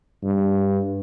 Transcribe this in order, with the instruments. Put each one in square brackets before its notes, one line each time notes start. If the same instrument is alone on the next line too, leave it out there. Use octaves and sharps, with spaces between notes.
[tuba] G2